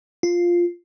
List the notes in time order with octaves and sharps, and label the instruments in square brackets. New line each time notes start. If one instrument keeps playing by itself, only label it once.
[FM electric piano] F4